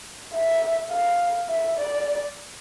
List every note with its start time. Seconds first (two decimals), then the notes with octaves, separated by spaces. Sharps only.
0.34 E5
0.91 F5
1.49 E5
1.77 D5